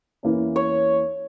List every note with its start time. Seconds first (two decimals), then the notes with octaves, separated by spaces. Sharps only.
0.23 E2 E3 A#3 C#4
0.56 C#5